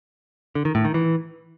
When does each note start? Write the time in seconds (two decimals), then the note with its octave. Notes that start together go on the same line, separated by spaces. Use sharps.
0.55 D3
0.65 D#3
0.75 A2
0.85 D#3
0.94 E3